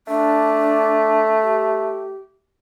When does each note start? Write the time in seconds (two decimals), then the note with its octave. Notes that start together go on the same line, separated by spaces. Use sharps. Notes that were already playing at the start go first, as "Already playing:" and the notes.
0.07 A3 D4
1.40 G4